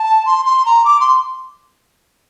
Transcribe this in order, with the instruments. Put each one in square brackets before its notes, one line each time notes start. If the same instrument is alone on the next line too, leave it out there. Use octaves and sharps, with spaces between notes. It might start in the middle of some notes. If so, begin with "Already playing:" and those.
Already playing: [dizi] A5
C6
C6
A#5
D6
C6